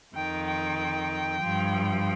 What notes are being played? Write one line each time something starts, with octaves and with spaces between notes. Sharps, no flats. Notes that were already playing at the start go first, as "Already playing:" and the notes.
F2 D#3 G5
G5
G2 F3